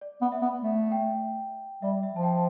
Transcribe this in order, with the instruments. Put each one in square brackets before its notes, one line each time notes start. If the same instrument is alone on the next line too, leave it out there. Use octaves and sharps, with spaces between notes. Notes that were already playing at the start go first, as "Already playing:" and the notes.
[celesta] D5
[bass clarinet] B3
[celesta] E5
[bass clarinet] B3
A3
[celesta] G5
[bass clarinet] G3 [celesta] E5
[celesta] E5
[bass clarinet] F3 [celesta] A5
[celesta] G5